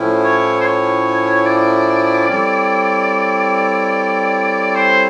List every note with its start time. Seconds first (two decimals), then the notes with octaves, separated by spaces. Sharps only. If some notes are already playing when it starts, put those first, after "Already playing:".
Already playing: A2 F3 A3 C#4 E4
0.24 C#5
0.61 C5
0.65 C#5
1.47 D5
2.29 G3 C4 E4 A4 C#5
4.76 C5